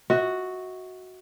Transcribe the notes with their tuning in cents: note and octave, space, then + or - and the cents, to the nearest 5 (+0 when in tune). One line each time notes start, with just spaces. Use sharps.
F#4 +0 E5 -45